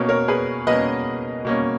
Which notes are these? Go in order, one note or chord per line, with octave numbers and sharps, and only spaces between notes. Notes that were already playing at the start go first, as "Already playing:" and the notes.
Already playing: B2 A#3 C#4
A#4 C#5
G#4 B4
B2 A#3 C#4 B4 D#5
B2 A#3 C#4